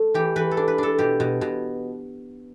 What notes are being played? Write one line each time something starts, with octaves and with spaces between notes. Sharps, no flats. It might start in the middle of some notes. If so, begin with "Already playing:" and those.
Already playing: A3 A4
E3 G4
E3 B4
A4
D4
B4
D4 A4
B2 G4
B2
B2